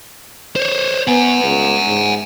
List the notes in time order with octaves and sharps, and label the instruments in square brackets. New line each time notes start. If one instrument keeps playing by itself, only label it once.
[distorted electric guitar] C5 C#5
[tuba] B3 [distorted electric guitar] F#5 G#5
[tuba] C#2
G#2